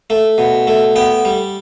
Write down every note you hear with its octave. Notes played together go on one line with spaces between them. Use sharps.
A3
B2
A3
B3 G5
G3